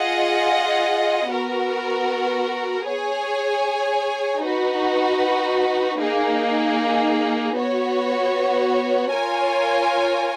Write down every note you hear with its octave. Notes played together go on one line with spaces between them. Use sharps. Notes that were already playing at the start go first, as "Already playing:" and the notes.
Already playing: F4 G#4 D#5 F#5
B3 F#4 A#4
G#4 C#5 G#5
D#4 F#4 B4
A#3 D#4 G#4
B3 F#4 C#5
F4 A#4 C#5 G#5